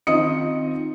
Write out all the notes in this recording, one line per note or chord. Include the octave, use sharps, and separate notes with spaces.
D#3 C4 F4 D#5 D#6 C#7